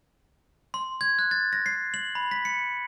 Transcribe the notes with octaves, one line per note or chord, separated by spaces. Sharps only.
C6
G#6
F#6
A6
A#6
C7
F#7
B5
B6
C#7